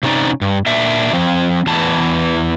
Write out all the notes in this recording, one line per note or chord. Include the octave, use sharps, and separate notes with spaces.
C3 C#4 D#4 D5
G2
A#2 D4 E5
F3 C4
E2 E3 A5